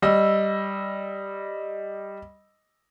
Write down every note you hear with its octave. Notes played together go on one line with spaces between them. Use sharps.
G3 D#5 E6